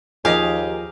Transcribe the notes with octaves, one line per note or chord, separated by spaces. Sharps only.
D#2 F3 G4 G#4 D#5 F5 G#5